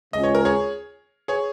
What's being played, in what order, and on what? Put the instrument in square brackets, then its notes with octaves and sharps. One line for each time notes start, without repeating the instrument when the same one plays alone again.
[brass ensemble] C#3 G#3 C#4 F4 [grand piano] D#5
[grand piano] C#5
A#4
G#4 C#5
G#4 C#5